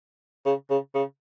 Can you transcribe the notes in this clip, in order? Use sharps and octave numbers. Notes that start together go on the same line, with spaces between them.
C#3
C#3
C#3